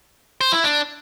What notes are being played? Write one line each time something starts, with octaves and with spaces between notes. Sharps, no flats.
C5
E4
D4